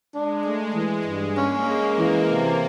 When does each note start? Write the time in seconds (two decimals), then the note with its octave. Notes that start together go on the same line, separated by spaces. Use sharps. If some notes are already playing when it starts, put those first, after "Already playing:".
0.13 G#3 D4
0.44 A3
0.75 E3
1.05 G2
1.36 A#3 C#4
1.67 G#3 A#3
1.98 E3 A#3
2.28 C3 A#3